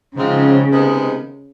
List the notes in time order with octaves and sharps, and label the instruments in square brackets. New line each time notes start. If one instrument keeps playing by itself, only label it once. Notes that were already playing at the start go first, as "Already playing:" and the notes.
[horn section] G#2 F3 G#3 C4 F4 [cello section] C#3
[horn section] C3 D#3 G#3 B3